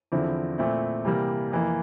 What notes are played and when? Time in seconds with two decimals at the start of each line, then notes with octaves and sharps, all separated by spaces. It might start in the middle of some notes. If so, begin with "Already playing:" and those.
0.12 E2 D3 F3 C4 E4
0.58 A#2 A3 C4 E4
1.05 C3 E3 G3 A#3
1.51 F2 E3 A#3